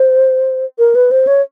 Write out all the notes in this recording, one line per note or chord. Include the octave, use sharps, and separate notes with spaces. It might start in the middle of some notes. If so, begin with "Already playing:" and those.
Already playing: C5
A#4
B4
C5
C#5